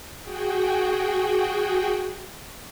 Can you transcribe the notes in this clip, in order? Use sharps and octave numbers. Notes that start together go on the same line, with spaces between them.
F#4 G#4 G5